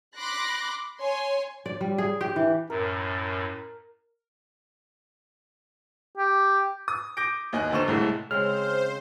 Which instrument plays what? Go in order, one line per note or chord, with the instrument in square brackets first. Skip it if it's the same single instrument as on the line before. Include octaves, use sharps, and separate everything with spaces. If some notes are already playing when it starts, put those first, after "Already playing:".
[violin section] B5 C6 D6 F#6 A#6
C#5 G#5 C6
[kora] D5
G3
G#4
G4
E3
[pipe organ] F#2 A2 [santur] A#4
[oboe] G4
[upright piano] D#6
D6 G6 A#6 D7
D#2 D#5 G#5 F#6
F1 D3 C5 C#6 E7
C2 A2 G#3 A3
[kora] C#3 G#3 C4 [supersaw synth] C5 [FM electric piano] F6